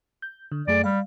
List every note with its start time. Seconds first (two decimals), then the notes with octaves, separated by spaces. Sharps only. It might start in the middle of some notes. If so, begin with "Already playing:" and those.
0.22 G6
0.52 D3
0.67 F#2 A3 G#4 D5
0.84 G3 F5